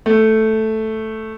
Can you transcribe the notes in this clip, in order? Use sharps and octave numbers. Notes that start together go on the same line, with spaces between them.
A3